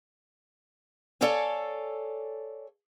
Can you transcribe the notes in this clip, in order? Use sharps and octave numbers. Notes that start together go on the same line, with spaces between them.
A4 C#5 D5 F5 G#5